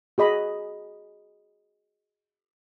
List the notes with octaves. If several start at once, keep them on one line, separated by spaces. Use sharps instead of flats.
F#4 G#4 D#5 B5